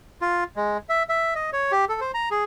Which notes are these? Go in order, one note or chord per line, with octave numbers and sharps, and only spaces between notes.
F4
G#3
E5
E5
D#5
C#5
G4
A4
C5
A#5
G#4